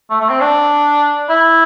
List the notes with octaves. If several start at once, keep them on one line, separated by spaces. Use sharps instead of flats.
A3
A3
C4
D4
E4